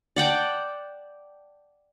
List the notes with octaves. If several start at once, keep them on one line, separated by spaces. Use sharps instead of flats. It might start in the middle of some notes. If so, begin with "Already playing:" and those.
D5 F#5 G5 A5